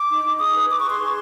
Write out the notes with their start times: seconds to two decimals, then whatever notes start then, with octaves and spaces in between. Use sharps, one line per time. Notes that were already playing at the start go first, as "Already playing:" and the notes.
Already playing: D6
0.09 D#4
0.24 D#4
0.39 G#4 D#6
0.54 B4
0.69 B4 D6
0.80 C#6
0.85 G#4 C6
1.00 G#4